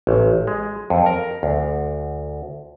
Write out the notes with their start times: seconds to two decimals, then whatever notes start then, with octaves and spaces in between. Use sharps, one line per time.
0.07 A1
0.47 G#3
0.90 F2
1.06 A#4
1.43 D2